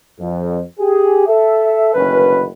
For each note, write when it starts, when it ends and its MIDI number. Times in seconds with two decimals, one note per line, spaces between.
0.20 0.61 41
0.80 1.27 67
0.80 1.27 68
1.27 1.94 69
1.27 1.94 76
1.94 2.46 30
1.94 2.46 38
1.94 2.46 51
1.94 2.46 61
1.94 2.46 71